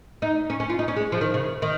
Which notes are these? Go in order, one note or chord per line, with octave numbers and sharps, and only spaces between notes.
D#4
C#4
C#4
F4
D#4
C#4
G#3
F3
D#3
C#3
D#3